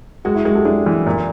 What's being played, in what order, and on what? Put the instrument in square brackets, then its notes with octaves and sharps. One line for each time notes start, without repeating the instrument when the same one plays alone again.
[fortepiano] G#3 [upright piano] F#4 G#4
[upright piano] E4 F#4
[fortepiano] G#3 [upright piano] F#4 G#4
[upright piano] G4 A4
[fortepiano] G#3 [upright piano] D4 E4
[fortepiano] E3
A#2